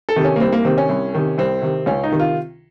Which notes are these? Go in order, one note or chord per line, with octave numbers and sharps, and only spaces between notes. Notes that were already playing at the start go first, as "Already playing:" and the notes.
A4
C3 D#3
C#4
A#3
C2 C4
A#3
C3 D#3 C4
C#4
C2
C3 D#3
C2 C4
C3 D#3
C#2 C#4
D#4
C3 D#3
F4